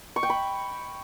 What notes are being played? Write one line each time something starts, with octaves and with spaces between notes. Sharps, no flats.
C#6
G5
B5